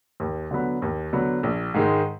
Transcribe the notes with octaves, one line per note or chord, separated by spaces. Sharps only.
D#2
D3 F#3 B3
D#2
D3 F#3 B3
A#1
G#2 D#3 G#3